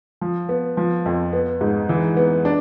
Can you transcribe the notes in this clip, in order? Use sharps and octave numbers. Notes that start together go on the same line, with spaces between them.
F3
B3
F3
F2
B3
G#2
E3
B3
D4